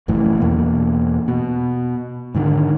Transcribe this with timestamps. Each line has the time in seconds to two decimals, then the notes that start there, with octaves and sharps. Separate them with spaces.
0.08 F1 F#2 A2 E3
0.39 E2 B2 A#3
1.28 B2
2.35 G#2 D3 D#3